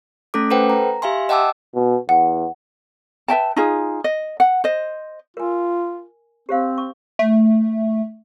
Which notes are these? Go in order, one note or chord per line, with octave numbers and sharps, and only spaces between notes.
A3 C#4 A4 D6
A4 B4 C5 F#5 G5
A#5
G4 E5 F5 G#5 C6
D#5 F#5 G5 A5 D6 E6
B2
E2 F#5
B4 E5 G5 A5
D#4 F4 G#4
D#5
F#5
C5 D#5
F4 A#4 G#5
C4 G4 C5 F5
C#6
A3